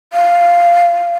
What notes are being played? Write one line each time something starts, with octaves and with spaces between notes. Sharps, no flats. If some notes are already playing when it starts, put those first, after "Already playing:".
F5